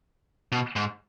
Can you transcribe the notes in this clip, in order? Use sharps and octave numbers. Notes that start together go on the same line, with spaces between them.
B2
G#2